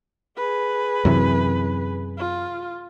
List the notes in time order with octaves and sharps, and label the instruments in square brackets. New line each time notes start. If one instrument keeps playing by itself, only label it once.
[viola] G#4 B4
[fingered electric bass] F#2 C3 E3
[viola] F4